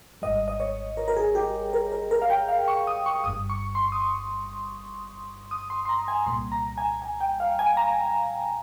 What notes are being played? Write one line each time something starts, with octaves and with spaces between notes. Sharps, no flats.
G#1 G#2 G3 D#5
D#5
C#5
A#4
A#4
G#4
G4
A#4
A#4
A#4
F5
G5
F5
C#6
D#6
C#6
G1 G2 G3 D#6
C#6
C6
D#6
C#6
D#6
C6
C6
A#5
G#5
C2 A#2 G3 C6
A#5
G#5
G#5
G5
F5
G#5
A#5